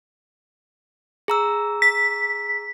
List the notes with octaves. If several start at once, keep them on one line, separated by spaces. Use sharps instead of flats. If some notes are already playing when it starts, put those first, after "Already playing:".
G#4 A#5 E6
B6